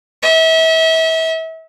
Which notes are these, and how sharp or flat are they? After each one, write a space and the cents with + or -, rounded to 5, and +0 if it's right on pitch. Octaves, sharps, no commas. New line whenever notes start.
E5 -35